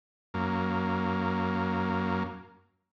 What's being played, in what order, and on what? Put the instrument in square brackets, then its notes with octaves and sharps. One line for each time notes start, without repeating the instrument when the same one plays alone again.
[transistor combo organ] F#2 A#3